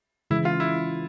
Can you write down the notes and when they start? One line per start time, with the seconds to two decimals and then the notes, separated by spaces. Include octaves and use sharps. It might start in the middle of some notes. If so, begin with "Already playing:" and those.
0.31 C#3 E3 G#3 E4
0.45 F4
0.60 E4